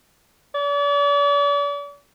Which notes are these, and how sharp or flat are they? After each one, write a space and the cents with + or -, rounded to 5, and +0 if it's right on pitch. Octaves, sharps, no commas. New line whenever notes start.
D5 -45